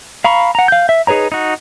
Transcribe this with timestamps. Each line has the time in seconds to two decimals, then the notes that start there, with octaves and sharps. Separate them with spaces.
0.24 F5 A#5 B5 C#6
0.55 F#5 A#5
0.68 F5 G6
0.89 E5
1.07 D#4 G#4 B4 C#5 A#5
1.32 D#4 F#4